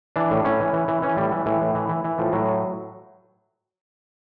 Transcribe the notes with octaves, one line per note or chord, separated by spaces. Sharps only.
E3 D4
A2
A2 C#4
E3
E3
E3
E3 C#4
A2 G3
E3
A2 E3
A2
E3
E3
E3
A2 F3
A2 F#3